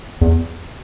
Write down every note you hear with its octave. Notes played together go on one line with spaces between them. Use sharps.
E2